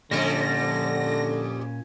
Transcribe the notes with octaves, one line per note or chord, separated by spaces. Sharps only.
F2 A#2 D3 G3 C#4 A#6